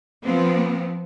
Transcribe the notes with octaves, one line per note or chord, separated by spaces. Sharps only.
F3 B3 C4